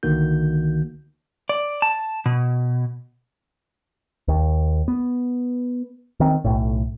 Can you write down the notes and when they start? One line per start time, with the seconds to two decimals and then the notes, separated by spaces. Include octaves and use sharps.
0.03 C2 D3 D#3 A#3 F#4 G6
1.49 D5
1.82 A5
2.26 B2
4.28 D#2
4.88 B3
6.20 D#3 C4
6.45 B1 A2